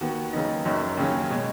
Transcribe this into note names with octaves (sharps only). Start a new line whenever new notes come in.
D#2 D#3 B3 F#4
D#2 C#3 F#3 B3 D#4
F#1 F#2 D#3 F#3
D#2 C#3 F#3 C#4
B2 G#3